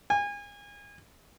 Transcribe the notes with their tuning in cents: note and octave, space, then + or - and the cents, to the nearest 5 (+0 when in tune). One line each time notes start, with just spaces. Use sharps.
G#5 -30